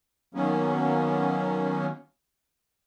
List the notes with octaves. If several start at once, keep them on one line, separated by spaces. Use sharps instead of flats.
D#3 F#3 A#3 B3 C#4